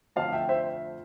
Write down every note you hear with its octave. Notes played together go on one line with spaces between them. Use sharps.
F2 D3 F3 A3 F5 A5
E5 G5
C5 E5